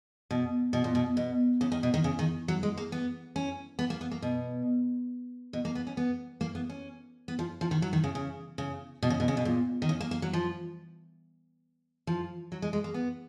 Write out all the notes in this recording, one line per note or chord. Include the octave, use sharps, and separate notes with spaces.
B2
B2
A#2
B2
B2
C#3
D#3
B2
D#3
C#3
D#3
F#3
G#3
A#3
B3
C#4
B3
A#3
B3
A#3
B2
B2
A#3
B3
C#4
B3
A#3
B3
C#4
B3
F3
F3
D#3
F#3
D#3
C#3
C#3
C#3
B2
C#3
B2
C#3
B2
A#2
D#3
C#3
A#3
A#3
F#3
F3
F3
F#3
G#3
G#3
A#3
B3